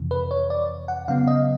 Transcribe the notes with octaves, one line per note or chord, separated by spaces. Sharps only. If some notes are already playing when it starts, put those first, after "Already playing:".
Already playing: F2 C3 E3
B4
C#5
D5
F#5
C#3 F#3 B3 F5
D#5